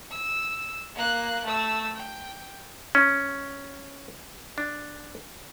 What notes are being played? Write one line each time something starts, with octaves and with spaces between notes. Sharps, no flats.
E6
A#3 F#6
A3 E6
G5
C#4
D4